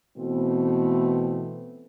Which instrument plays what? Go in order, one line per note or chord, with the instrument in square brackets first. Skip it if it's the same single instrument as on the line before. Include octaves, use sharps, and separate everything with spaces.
[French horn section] B2 E3 A3 C4